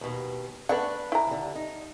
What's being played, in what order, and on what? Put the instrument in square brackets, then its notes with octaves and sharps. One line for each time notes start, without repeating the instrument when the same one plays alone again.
[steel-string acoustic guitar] D#2 B2
[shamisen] A3 B3 F#5 [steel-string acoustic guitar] D4 B4
[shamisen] E4 A#5
[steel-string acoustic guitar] D#2 D3
D#4